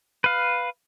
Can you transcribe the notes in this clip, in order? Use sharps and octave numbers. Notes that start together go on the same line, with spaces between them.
B4 F5